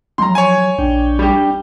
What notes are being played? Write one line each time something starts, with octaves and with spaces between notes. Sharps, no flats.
F3 F#3 A#5 C6
C#5 G#5
A#1 D4 G5
G3 G4